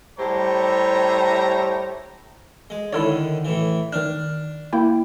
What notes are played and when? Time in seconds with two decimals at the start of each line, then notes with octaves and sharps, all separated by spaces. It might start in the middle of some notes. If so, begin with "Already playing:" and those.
0.18 A2 G3 G4 C5 C#5 A#5
2.70 G#3
2.93 D3 D#3 E4 A4 C#5
3.45 A2 E3
3.92 D#3 D4 F6
4.73 A#3 E4 G5